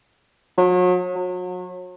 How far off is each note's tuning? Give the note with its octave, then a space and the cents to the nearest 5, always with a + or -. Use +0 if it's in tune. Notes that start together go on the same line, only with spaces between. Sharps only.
F#3 -40
F#3 -35